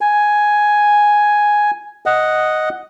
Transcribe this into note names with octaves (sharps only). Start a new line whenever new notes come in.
G#5
D#5 F#5